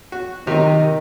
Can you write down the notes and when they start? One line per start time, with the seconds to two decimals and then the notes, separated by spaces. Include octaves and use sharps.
0.12 F#4
0.47 C3 D#3 D#4